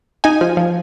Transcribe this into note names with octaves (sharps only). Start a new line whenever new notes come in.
D#4 G#5
F3
F3